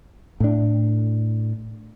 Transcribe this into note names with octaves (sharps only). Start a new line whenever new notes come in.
A2 D4